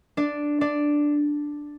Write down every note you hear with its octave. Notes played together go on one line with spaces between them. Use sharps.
D4 D5
D4 D5